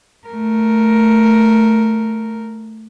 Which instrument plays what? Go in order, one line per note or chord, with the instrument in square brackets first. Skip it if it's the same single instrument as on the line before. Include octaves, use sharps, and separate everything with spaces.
[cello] A3 A#4